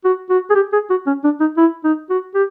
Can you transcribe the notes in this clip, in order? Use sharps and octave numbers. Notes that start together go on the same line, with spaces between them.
F#4
F#4
G#4
G4
G#4
F#4
C#4
D4
D#4
E4
D#4
F#4
G4